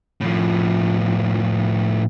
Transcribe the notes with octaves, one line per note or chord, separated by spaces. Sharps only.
A2 F3